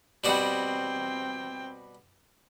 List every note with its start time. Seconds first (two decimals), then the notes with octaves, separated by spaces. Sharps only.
0.24 B2 G3 C4 F#4 G5